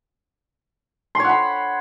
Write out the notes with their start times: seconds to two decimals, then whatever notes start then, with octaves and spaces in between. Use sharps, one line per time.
1.15 C6
1.20 C#5
1.24 F#5
1.29 B5